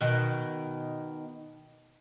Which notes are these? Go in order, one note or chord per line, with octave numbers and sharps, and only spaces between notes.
B2 D#3